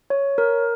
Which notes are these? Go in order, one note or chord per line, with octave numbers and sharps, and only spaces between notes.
C#5
A#4